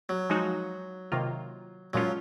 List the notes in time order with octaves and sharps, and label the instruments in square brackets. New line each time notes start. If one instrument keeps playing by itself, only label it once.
[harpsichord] F#3
[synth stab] F3 G#3 D#4 F#4
C3 D#3 A#3 F4
[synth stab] A#2 F3 G#3 C#4 F4 [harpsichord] F#3